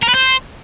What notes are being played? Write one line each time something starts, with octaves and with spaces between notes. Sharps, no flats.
A#4
B4
C5